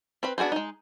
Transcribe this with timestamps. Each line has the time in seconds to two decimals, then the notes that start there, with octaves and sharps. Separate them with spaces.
0.23 C4 B4 B5
0.38 B3 D4 F#4 G#4 C5
0.52 G#3 D#4